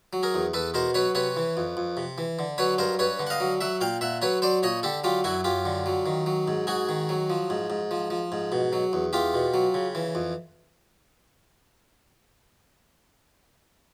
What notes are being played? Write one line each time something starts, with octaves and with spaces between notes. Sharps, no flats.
F#3
G#4 A#4
E2
E2 A4 B4
B2 A#4 C5
F#3 B4 C#5
C3 B4 C#5
E3
F2
F2
C3
E3
D3
F#3 B4 C#5
G2 A#4 C5
G2 B4 C#5
D3
F#5
D#5 F5
F#3
F#3 E5 F#5
A#2 F5 G5
A#2 E5 F#5
F#3 B4 C#5
F#3 C5 D5
A#2 C#5 D#5
D3 G4 A4
F#3 F4 G4
F#2 E4 F#4
F#2 F4 G4
D3
F#3
D#3
F#3
G#2
G#2 F#4 G#4
D#3
F#3
F3
G#2
G#2
F3
F3
G#2
B2
F#3
E2
E2 F4 G4
B2
F#3
C#3
E3
F2